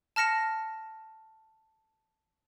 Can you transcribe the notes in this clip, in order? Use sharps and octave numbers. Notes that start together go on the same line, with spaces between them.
A5 F6 A#6 C#7 E7